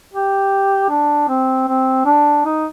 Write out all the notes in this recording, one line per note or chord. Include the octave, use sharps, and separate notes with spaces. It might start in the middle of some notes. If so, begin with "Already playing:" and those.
G4
D4
C4
C4
D4
D#4